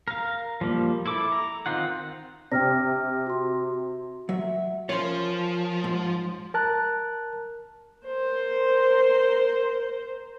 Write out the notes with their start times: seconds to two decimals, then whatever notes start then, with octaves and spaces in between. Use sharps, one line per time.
0.08 A#4 F5
0.61 F3 G3 A#3
1.06 E4 A4 D6
1.32 A#5
1.66 D#3 C4 D#4 F4 F#5
2.52 C3 G5 F6 A#6
3.27 F#4 C6
4.29 F#3 E5
4.89 F3 C#4 A#4 C#5 C6
5.84 G#2
6.54 A#4 A5 F#6
8.07 A#4 C5